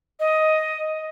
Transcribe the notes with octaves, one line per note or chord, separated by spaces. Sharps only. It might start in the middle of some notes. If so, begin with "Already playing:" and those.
D#5